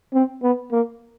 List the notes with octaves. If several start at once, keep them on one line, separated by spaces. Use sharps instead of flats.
C4
B3
A#3